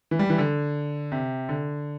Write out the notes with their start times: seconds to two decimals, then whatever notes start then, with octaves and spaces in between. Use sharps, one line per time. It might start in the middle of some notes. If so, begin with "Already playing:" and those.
0.11 E3
0.19 G3
0.30 E3
0.38 D3
1.12 C3
1.49 D3